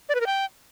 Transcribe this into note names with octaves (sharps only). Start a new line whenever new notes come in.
D5
B4
A#4
G5